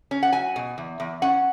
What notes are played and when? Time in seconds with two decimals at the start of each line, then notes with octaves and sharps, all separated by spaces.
0.11 C#4
0.23 F#5
0.33 F#3 G#5
0.56 B2
0.78 E2
1.00 E2
1.22 C#4 F#5